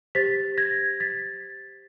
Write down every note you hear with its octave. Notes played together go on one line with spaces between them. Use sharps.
G4 C5 A6 B6
G#6 A#6
A6 B6